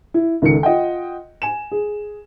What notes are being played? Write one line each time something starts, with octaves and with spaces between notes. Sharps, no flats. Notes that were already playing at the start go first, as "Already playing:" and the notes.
E4
C#2 D#3 A4 C#7
F4 D#5 F#5 G5
G#5 E7
G#4